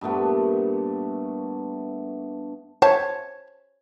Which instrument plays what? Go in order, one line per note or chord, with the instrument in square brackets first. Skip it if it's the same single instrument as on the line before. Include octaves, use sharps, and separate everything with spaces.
[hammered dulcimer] G2 A#2 A3 B3
[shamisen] C5 E5 A5 [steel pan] C#5